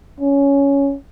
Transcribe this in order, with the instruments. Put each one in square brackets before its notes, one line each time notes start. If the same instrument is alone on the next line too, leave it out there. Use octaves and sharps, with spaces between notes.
[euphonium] C#4